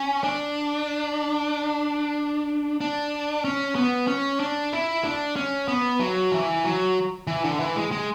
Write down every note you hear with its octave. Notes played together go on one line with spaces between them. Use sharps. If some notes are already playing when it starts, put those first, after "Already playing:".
Already playing: C#4
D4
D4
C#4
B3
C#4
D4
E4
D4
C#4
B3
F#3
E3
F#3
E3
D3
E3
G#3
G#3